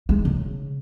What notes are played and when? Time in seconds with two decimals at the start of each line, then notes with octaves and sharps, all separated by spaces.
0.09 G#3
0.25 C#3